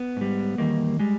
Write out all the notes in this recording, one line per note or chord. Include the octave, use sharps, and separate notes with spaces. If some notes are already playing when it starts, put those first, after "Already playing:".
Already playing: B3
G#2 G3
E2 D#3 G3 A#3
G3 G#3